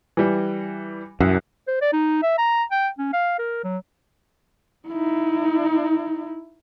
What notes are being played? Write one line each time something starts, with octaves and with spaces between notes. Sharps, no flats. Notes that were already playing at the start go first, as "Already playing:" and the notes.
E3 G3
C2 F#2
C5
D5
D#4
E5
A#5
G5
C#4
F5
A#4
F#3
D#4 E4